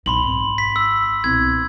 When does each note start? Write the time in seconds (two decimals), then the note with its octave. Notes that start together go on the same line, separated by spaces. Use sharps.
0.06 B1 B2 B5 C6 F#7
0.23 G#1
0.58 B6
0.76 E6
1.24 C2 B2 G#6